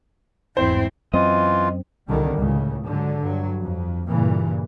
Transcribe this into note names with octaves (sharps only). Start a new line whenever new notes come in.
G1 E2 G#2 C4 E4 C5
F#2 E3 C4 F4 D#5
C2 D3 D#3 G3
C#2 A2 C#3
G#2 D3 F#3
G2 F#3
F2
G2 A#2 C#3 E3